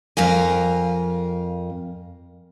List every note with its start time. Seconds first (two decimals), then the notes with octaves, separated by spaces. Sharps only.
0.17 F2 A#4 F5 G#5